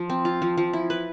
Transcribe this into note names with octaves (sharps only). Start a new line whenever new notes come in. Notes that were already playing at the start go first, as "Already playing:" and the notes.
Already playing: F3
C4
F4
F3
F3
E4
B4